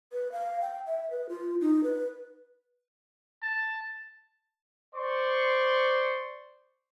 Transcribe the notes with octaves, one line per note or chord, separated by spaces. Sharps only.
B4
F5
G5
E5
B4
F4
D#4
B4
A5
C5 D5 C6 C#6